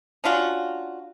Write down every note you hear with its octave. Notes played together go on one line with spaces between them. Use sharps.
C#4 D4 F4 F#4